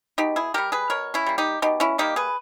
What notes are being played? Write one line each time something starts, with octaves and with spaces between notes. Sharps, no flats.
B2 D#4 G4
E4 G#4
G3 A#3 G4 A#4
G#4 B4
B2 A#4 C#5
C#4 E4
G3 A#3
D#4 G4
B2 D#4 G4
C#4 E4
G3 A#3 D#4 G4
G#4 B4